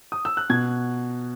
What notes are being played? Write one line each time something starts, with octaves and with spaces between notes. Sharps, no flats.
D#6
E6
F#6
B2 G#6